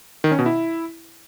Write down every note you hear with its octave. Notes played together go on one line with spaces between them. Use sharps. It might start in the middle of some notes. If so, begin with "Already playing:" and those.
D#3
C#4
B2
E4